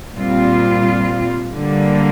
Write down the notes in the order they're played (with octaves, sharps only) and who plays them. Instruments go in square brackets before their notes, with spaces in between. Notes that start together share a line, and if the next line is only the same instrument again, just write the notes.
[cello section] A#2 G3 C4 F4
D3 G3 A#3